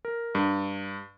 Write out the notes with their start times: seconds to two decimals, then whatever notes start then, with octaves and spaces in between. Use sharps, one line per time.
0.05 A#4
0.35 G2